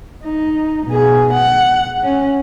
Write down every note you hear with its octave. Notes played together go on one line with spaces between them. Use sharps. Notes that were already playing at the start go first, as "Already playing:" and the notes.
D#4
B2 G#4
F#5
C#4